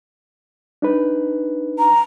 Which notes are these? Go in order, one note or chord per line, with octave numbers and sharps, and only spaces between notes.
D4 D#4 B4
A#5